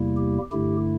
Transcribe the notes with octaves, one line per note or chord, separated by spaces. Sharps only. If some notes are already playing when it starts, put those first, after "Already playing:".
Already playing: E2 C3 G3 A#3 E4
G4
G2 D3 A3 E4 G4